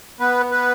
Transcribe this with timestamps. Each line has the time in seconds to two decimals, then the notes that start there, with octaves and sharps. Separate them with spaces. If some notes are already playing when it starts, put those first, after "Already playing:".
0.20 B3 B4
0.51 B4